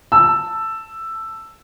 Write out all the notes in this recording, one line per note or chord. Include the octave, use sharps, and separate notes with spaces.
A5 E6